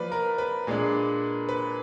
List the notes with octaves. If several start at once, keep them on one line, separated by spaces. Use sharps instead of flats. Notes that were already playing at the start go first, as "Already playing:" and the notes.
Already playing: F3 A#3 B4 D5
A#4
B4
A#2 G#3 D4
B4